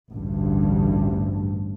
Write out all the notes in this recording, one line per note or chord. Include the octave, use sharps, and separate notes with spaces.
A1 D2 G2